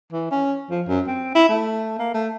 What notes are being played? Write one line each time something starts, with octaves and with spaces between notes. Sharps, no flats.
E3
C#4
F3
F#2
C4
E4
A3
A#3
A3